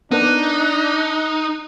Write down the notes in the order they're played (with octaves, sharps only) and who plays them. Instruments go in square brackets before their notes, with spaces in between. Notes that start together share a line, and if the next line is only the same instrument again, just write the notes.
[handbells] B3 A#4 B4 [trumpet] D4 [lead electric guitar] D#4 [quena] F#6